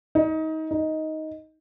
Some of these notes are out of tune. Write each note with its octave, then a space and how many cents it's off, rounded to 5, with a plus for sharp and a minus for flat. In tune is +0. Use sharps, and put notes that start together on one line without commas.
D#4 +25
D#4 +10